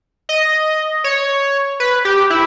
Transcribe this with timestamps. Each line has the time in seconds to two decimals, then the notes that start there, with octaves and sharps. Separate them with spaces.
0.29 D#5
1.04 C#5
1.80 B4
2.05 G4
2.30 E4